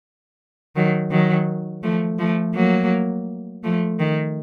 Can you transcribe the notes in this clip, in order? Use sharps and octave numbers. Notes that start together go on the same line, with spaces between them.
D#3 F#3
D#3 F#3
F3 A3
F3 A3
F#3 A#3
F3 A3
D#3